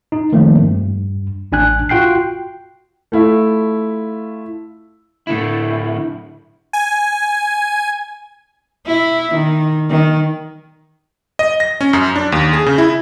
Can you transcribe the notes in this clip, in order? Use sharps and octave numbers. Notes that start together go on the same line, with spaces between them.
D#4
D#3 F3 A3 A#3 C4
G2
A1 D4 G#5 F#6
F4 F#4 G5 F#6 C7
A3 E4 F4
A2 D3 E4
G#5
E4
D#3
D#3
D#5
A#6
C#4
F#2
D4
D#2
G#4
C#3
E4